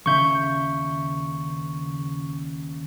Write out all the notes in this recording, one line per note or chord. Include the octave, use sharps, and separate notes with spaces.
D#2 C#3 E5 C#6 G6